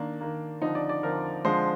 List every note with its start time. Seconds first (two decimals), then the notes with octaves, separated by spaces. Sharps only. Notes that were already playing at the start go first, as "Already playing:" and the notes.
Already playing: D#3 A#3 D4
0.21 D#3 A#3
0.62 D3 F3 C4 D#4
0.75 D5
0.89 D5
1.03 D3 F3 C4 A#4
1.45 D3 F3 G#3 C4 C5